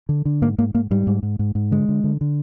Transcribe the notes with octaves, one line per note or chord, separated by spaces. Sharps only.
D3
D3
G#2 A#3
G#2 A#3
G#2 A#3
G#2 G3
G#2
G#2
G#2
G#2
D3 G#3
D3
D3
D3